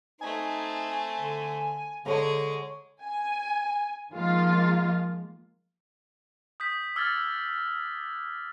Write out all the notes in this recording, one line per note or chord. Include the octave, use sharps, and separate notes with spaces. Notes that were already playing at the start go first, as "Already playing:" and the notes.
A3 C4 D#4 G#5
D3
D3 G#3 G#4 C#5 A#5
G#5
D#3 F3 G#3 A#3 F4
D#6 G6 B6
D6 E6 F6 G#6 A6